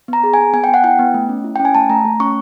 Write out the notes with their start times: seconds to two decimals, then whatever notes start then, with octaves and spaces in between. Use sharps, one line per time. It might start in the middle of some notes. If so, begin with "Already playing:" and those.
0.08 B3 A#5
0.24 G#4
0.34 G#5
0.38 B3
0.54 B3 G#5
0.64 G5
0.69 B3 F#5
0.84 E4 G5
0.99 B3
1.14 A3
1.29 C#4
1.44 E4
1.56 C#4 G5
1.65 G#5
1.75 A3 A5
1.90 A3 A#5
2.05 A3
2.20 C#4 C#6